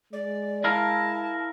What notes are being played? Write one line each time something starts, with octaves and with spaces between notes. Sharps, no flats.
G#3 D5
E4 A#4 F5 A5